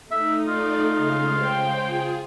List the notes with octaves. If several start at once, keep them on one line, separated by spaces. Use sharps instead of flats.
A3 D#4 E5
F4 D5
C#3 G#3 F5
C5 G5
F4 G#4